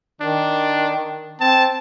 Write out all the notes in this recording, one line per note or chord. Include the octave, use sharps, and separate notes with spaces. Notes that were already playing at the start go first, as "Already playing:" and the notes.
D#3 D4
C4 A5